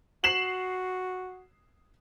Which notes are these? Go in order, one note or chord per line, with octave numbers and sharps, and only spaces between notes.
F#4 C7 E7 F#7